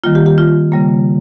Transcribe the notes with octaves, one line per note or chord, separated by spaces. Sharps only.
D#3 G3 A#3 F4
G4
G4
F4
C#3 G3 A#3